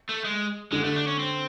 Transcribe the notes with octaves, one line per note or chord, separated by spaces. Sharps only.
A3
G#3
D3 G#3
A3
D4
C#4
C4